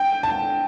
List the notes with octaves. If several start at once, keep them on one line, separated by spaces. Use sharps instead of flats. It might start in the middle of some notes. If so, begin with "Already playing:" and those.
Already playing: G5
A5